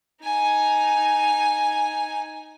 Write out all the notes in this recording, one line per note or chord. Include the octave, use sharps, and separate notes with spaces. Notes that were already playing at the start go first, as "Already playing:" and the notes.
D#4 G#5